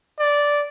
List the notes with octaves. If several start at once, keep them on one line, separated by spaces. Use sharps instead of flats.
D5